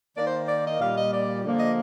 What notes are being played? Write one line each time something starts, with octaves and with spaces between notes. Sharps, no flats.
D#3 A#3 D5
C5
D5
D#5
A#2 G3 A#3 F5
D#5
D5
D3 F3 A#3
D#5